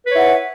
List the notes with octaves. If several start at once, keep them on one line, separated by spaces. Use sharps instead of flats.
E4 B4 C#5 F#5